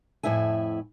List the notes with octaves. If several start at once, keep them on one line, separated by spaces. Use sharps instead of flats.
F2 A2 C3 E4 E5 G#5